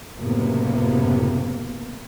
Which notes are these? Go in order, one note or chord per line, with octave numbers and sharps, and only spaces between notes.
F#1 A2 C3 A#3 B3